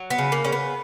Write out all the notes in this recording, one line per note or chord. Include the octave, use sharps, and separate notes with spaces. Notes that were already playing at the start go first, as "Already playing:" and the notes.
Already playing: F#3
B3
C#3
A#3
C#3 C#4
B3